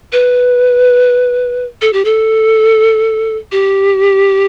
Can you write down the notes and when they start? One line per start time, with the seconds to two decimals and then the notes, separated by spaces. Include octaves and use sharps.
0.12 B4
1.81 A4
1.93 G4
2.05 A4
3.52 G4